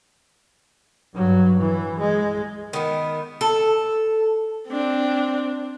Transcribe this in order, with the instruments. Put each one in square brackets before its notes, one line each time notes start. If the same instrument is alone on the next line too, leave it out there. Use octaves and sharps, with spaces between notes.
[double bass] G2 F#3
E3
G#3
[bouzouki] D#3 B3
A4
[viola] C4 D4